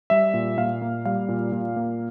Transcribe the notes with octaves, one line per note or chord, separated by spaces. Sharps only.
G3 E5
A#2
A#2 F5
A#3
G3 F5
A#2
A#2
A#3